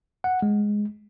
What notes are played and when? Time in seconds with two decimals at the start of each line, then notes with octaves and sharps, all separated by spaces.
0.24 F#5
0.42 G#3